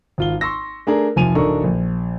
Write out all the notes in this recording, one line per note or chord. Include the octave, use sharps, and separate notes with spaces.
G#1 F4 G7
C6 C#6 E6 A#6
A3 D4 G#4 A#4
F1 F3 G#5 D#7 F7
D1 D4 D#4 A4 A#4 C#6
A#1